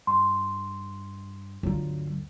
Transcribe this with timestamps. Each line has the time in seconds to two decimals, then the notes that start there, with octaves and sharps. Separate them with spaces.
0.07 G2 C6
1.63 G1 D2 F#3 F4